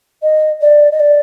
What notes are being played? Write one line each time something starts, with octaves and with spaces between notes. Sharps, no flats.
D#5
D5
D#5
D5